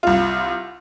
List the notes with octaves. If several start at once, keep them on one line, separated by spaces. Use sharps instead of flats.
C2 F4